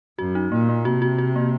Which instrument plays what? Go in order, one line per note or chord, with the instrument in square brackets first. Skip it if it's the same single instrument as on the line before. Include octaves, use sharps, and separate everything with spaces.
[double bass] F#2 [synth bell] F#4
[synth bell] D#4
[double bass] A#2 [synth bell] A#3
[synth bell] A#3
[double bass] C3 [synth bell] F#4
[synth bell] F#4
F#4
A#3